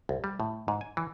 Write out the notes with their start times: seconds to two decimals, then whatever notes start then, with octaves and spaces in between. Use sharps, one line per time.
0.09 C2
0.24 G3
0.40 A2
0.68 G#2
0.81 G#5
0.97 E3